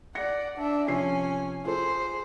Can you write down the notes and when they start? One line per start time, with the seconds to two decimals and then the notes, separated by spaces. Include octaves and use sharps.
0.15 D5 F#5 A#6 C#7
0.57 D4 E5
0.88 C3 F3 C#4 G#5 C7
1.65 F4 G#4 A4 C5